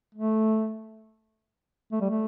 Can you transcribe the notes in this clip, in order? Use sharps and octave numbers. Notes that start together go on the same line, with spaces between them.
A3
A3
G3
A3